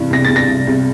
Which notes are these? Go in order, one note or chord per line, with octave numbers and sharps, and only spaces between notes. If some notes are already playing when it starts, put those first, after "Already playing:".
Already playing: G2 C3 E3
C2 A#6
C2 A6
A#6
C2
C2